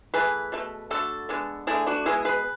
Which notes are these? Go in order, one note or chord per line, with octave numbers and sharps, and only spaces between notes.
E3 A3 G#4 B4
B2 A3
D3 A3 F#4 A4
D3 G#3 B3
D3 A3 E4 G#4
D4 F#4
B2 G#3 B3 E4 G#4
G#4 B4